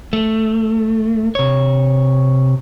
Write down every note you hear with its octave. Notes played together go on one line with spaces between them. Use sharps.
A3
C3 C#5